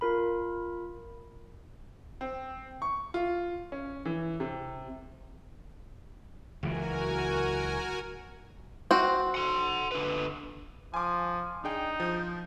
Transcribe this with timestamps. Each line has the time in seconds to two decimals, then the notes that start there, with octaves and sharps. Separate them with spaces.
0.01 F4 A#4 B5
2.21 C4
2.82 C#6
3.14 F4
3.72 C#4
4.05 E3
4.40 C3
6.63 C#2 E3 F#3 F#4 A#4 G#5
8.91 C4 F#4
9.35 F#5 C6
9.92 D3 B4
10.94 F3 G#5 D6
11.64 D4 D#4 G#4 G5
12.00 F3 G6